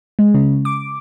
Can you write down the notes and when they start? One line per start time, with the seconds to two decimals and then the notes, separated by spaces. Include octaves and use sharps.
0.19 G#3
0.34 C#3
0.65 D6